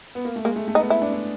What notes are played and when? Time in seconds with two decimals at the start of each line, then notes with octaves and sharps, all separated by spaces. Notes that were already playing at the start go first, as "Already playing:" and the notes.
0.15 B3
0.25 A#3
0.36 A3
0.45 G#3 A#3
0.56 A3
0.68 A3
0.75 D#4
0.79 B3
0.90 E4
1.02 D4
1.12 D4